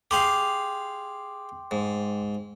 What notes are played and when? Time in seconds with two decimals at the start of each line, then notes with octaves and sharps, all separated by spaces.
0.11 G4 G#4 F5 G5 C6 D6
1.71 G#2